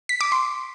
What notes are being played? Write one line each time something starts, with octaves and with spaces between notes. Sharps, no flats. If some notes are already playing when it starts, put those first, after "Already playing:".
B6
D6
C6